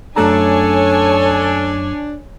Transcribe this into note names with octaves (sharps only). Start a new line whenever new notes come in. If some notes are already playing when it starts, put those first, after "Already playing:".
F#2 A3 D4 A4 C#5 G#5 A#5